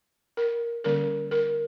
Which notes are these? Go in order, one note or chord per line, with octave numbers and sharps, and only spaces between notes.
A#4
D3 G3 A#3 C#4 A#4
A#4